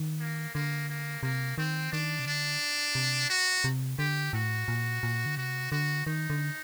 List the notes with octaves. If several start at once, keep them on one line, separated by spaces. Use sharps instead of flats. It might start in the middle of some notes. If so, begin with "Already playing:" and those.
Already playing: D#3
A#3
D3 A#3
A#3
C3 A#3
D#3 C4
D#3 D4
C3
D3 D4
C3
F#4
C3
D3 G4
A2 F#4
A#2
A#2
D3
C3 F#4
D3 F#4
D#3 D#4
D3